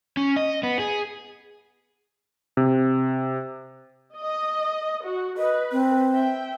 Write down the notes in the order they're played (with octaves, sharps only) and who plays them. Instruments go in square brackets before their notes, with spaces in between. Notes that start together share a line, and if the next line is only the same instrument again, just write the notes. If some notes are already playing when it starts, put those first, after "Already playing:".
[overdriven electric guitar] C#4
D#5
B3
G#4
[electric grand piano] C3
[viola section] D#5
F#4
[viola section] B4 [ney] D#5
[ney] C4
[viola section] E5 G5